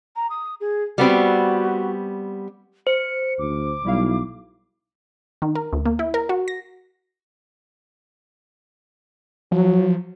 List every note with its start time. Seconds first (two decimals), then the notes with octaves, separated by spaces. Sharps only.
0.16 A#5
0.30 D#6
0.60 G#4
0.98 G3 B3 C4 F#4
2.87 C5 C#7
3.39 D2 D6
3.85 B1 G3 E4 F5
5.42 D#3
5.55 A#4
5.73 D2
5.85 A#3
5.99 E4
6.14 A#4
6.29 F#4
6.48 A#6
9.52 F3 F#3